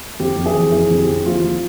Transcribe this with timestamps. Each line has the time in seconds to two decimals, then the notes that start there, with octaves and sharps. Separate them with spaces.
0.20 F2 G4
0.36 F2
0.46 G#4
0.54 E3
0.72 F2 G#4
0.90 F2
0.99 G4
1.08 F2
1.26 F3 F4
1.44 F3